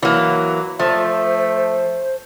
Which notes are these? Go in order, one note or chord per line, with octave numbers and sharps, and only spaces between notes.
E3 F#3 A#3
F3 A3 C5